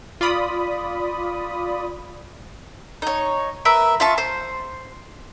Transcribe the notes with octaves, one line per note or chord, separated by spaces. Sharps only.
F4 D5 B5 D#6
D#4 C#5
A#4 B4 E5
F4 E5 A5 C#6
C5